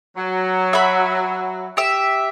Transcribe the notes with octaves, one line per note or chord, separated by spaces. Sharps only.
F#3
E5 B5
G4 E5